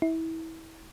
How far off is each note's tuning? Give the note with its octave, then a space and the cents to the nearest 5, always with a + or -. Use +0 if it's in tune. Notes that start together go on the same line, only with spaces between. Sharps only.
E4 -25